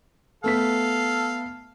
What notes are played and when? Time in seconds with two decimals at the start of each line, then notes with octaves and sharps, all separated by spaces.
0.44 A3 B3 A4 F5 B6